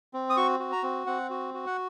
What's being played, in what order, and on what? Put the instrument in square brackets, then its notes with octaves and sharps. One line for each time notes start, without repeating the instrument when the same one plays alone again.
[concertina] C4
D#6
F#4 C#6
F#4
A#5
C4
C4 F#5
F#4
F#4
F#5